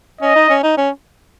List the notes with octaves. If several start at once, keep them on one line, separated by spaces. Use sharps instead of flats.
C#4 D#5
D#4
C#4
D#4
C#4